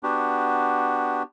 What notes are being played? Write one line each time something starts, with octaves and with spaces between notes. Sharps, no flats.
B3 D4 F#4 G4